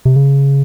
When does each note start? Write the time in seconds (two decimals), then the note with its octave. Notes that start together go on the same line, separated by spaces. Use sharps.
0.05 C3
0.16 C#3